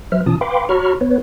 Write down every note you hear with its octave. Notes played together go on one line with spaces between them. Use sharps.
F#3 B4 C5 E5 F6
B2 E3 C#4 F4 A5 D#6
B4 F5 G5 B5 C6 D6
F#4 C#5 A#5 B5 C#6 F6
B3 B4 C#5